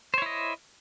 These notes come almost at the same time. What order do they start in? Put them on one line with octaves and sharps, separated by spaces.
C5 C#5 E4 D#5